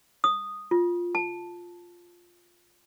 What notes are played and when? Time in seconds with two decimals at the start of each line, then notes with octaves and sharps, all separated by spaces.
0.24 D#6
0.71 F4
1.15 A5